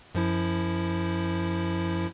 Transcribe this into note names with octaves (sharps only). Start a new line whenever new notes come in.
F#2 F3 E4